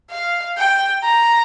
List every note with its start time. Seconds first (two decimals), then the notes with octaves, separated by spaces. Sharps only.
0.10 F5
0.57 G5
1.03 A#5